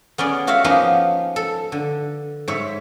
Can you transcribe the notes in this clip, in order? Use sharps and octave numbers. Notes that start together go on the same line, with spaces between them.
B3 C#4 G#4 D5
F4 F#4 C#5 E5 F5
F3 A#3 B3 C#4 D#4
A4
D3
G#2 C#5 E5